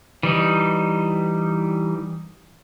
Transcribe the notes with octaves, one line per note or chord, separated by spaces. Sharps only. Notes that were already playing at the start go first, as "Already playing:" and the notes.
E3 G3 D#4